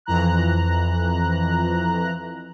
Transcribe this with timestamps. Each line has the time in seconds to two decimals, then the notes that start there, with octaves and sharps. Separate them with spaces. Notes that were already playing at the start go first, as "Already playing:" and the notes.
0.06 F2 E3 A#5 F#6